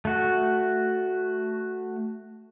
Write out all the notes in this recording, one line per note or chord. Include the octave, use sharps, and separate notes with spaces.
A3 F#4